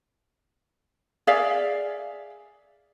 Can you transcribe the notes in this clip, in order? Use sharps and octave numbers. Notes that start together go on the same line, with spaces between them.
G#4 D5 E5 F5